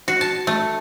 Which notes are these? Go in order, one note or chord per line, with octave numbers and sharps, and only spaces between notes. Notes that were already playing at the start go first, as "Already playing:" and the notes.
F#4
A5
A3